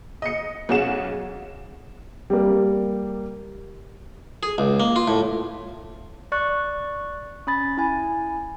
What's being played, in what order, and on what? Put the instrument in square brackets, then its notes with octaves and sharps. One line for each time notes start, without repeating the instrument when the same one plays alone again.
[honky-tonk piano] D#5 C#7
B1 C#4 G#4 F#5 E7
[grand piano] G3 A#3
[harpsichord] G#4
C#2
A#3
F4
A2
[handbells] D5 C#6 F#6
C#4 B5 A6
E4 G#5